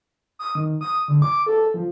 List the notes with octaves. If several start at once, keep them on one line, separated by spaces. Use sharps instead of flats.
D#6
D#3
D#6
D3
D6
A4
F3